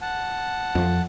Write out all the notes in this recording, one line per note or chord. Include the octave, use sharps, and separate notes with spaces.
F#5 A5
F2 F3